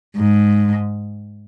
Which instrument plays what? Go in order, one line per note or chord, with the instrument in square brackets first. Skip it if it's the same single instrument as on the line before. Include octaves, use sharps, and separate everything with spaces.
[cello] G#2